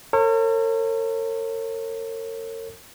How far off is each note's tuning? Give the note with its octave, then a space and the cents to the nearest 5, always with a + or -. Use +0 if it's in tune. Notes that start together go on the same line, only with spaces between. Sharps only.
A#4 -45 C#5 -35